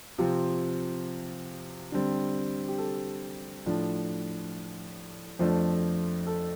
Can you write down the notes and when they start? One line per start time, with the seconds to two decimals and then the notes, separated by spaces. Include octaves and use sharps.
0.18 C3 F3 C4 F4
1.92 D3 G3 C4
2.68 G4
2.78 A4
3.66 A2 F3 D4
5.39 F2 F3 A3 D4 C5
6.27 A4